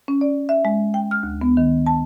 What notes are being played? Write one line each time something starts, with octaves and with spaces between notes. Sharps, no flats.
C#4
D5
E5
G#3
G5
F6
D2
B3
D#3
A5